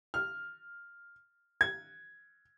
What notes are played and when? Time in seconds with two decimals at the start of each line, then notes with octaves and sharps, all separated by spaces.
0.14 F6
1.61 G#6